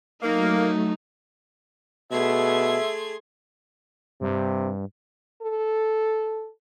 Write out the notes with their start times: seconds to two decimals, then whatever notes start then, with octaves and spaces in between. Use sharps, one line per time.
0.22 F#3 A3 A#3 D#4
2.11 B2 A3 G#4 E5 C6 G#6
4.21 G2 C3
5.42 A4